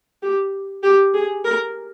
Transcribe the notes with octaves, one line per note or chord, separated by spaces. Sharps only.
G4
G4
G#4
A#4